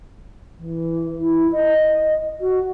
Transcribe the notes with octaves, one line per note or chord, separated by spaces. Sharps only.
E3
E4
D#5
F#4